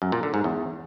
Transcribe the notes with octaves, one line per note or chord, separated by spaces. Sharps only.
F#2
A#2
D3
G#2
E2